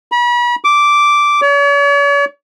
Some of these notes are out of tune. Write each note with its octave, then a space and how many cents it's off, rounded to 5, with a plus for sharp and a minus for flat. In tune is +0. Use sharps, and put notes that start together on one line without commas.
B5 -40
D6 -5
C#5 +45